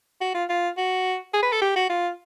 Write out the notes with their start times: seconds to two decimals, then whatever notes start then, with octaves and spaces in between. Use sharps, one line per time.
0.21 F#4
0.34 F4
0.49 F4
0.77 F#4
1.34 G#4
1.43 B4
1.52 A4
1.61 G4
1.76 F#4
1.90 F4